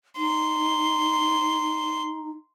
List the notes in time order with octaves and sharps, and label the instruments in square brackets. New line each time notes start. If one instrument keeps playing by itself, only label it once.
[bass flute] D#4 [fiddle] C6